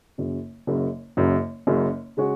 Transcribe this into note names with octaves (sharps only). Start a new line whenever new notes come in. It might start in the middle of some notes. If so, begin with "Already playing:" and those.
F#1 F#2 C#3
F#1 F#2 C#3
F#1 F#2 C#3
F#1 F#2 C#3
C#3 G#3 C#4 F#4